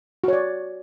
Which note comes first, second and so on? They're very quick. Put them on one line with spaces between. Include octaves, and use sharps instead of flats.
F#4 C#5 D5